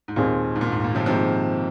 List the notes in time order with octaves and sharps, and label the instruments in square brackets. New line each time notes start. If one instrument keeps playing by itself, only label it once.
[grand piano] G#2
[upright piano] D#2 D#3 G#3 C4 G#4 [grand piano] A#2
[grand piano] G#2
A#2
G#2
A#2
C3 F3
[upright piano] G#2 D#3 A#3 [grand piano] C3 F3